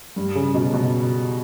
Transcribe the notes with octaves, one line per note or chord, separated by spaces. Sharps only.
G2
C#3
B2
B2